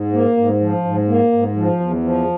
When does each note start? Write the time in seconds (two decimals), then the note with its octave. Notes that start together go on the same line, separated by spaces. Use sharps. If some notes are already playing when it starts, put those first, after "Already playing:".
Already playing: G#2
0.13 A#3
0.37 G#2
0.61 F3
0.84 G#2
1.08 A#3
1.32 G#2
1.56 F3
1.80 E2
2.04 F3